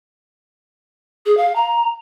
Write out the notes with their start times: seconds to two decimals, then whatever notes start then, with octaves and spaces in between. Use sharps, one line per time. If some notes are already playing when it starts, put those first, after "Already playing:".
1.26 G#4
1.37 F5
1.56 A#5